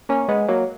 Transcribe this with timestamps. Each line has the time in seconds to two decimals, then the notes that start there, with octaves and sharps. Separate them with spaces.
0.09 A#3 C#4
0.28 G#3 B3
0.48 F#3 A#3